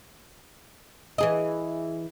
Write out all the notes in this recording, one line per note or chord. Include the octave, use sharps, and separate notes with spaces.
E3 G#4 D#5